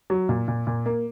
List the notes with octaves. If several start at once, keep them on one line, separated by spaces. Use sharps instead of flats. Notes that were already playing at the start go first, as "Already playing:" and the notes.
F#3
A#2
A#2
A#2
A#3